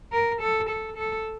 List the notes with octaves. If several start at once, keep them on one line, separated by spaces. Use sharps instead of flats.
A#4
A4
A4
A4